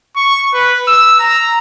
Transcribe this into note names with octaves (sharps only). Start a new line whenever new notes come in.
C#6
B4
E6
A#5